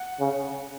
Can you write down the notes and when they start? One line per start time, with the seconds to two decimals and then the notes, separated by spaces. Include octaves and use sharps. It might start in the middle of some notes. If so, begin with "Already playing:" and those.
Already playing: F#5
0.20 C#3